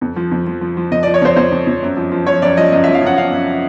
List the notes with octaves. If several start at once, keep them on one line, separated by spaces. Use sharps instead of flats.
F2
F3
F2
F3
F3
F3
F2 D#5
D5
F3
C#5
F2 C5
F2 C5
F2
F2
F#2
F3
F3
F3 C#5
F#2 D5
F3 D#5
F#2 D#5
E5
F3
F5
F#2 F#5
F#2 F5
F#2